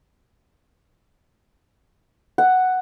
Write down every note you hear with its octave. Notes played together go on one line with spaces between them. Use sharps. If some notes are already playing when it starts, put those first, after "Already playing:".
F#5